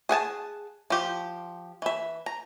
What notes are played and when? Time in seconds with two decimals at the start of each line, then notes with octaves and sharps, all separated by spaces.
0.09 G#4 F#5 G#5 A5
0.90 F3 G4
1.82 E3 E5
2.26 A#5